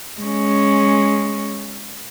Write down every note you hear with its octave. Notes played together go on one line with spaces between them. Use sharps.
G#3 C#4